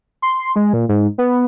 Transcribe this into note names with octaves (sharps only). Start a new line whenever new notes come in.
C6
G#3
A#2
G#2
B3